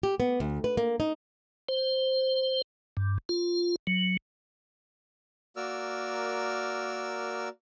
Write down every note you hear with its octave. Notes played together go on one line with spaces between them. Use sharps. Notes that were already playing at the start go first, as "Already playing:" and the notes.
G4
B3
D2
B4
A#3
D#4
C5
G2
F4
F#3
A#3 F#4 A#4 D5 E6 F6